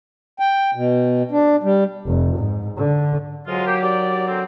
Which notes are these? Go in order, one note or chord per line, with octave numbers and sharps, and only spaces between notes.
G5
B2
D4
G3
F1
G#2
D3
F2 F#3 G#3 F4
A#3 G4
D#2 G4 D5
D3 A#3 C4